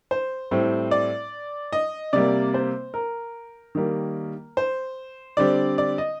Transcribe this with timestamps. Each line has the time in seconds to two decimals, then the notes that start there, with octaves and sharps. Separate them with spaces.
0.11 C5
0.51 A2 G3 C4
0.91 D5
1.72 D#5
2.13 C3 G3 A#3 D5
2.54 C5
2.94 A#4
3.75 D#3 G3 A#3
4.57 C5
5.37 D3 G3 C4 D5
5.78 D5
5.98 D#5